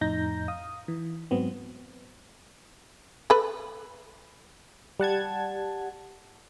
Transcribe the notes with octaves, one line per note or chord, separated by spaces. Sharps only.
F2 A2 D#4 A#5 G6 A#6
F5 D#6
E3
G#2 F#3 B3 C4
A4 B4
G3 F#5 A5 G#6